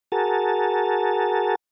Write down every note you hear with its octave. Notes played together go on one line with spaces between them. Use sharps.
F#4 G#4 A#4 A5